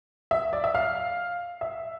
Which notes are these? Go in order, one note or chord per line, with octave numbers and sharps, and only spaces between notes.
E5
D5
E5
F5
E5